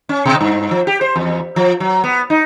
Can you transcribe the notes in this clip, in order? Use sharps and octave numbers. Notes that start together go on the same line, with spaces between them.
C#4
B2
G2
F3
G4
C5
E2
F3
F#3
B3
D#4